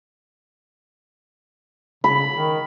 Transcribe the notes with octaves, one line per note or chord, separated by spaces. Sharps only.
C#3 B5
D#3